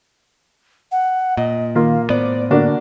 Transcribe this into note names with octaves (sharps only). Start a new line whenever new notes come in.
F#5
A#2 D#5
D#3 A#3 F4 F5
A2 B3 C5 D5
D3 A#3 D4 F#4